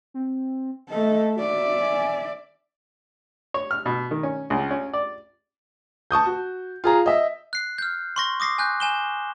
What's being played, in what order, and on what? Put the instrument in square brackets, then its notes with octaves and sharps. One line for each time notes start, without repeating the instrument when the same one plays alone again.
[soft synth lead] C4
[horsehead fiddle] A3 A4 [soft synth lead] D#5
[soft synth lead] F#4 [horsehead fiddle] D5 E5
[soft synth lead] G#5
[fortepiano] C#5
F6
B2
D#3
C#4
C#2
C#4
D5
[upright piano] A5 C#6 D#6 G6
F#4
F4 G#4 A#5
D#5 E5
[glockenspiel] F#6 C7
F6 G6
C6 C#6 A#6
D6 D#6 A#6 C7
G#5 F#6 G6
G#5 E7 G7